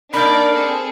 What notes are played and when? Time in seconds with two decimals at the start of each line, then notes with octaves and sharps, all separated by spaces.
0.14 A#3 D4 D#4 A#4 D5 B5 G6
0.54 C4 G#4 A4